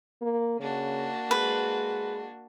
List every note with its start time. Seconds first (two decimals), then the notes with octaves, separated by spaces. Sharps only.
0.22 A#3
0.59 C#3 A#3 D4 F#4
1.31 G#3 B4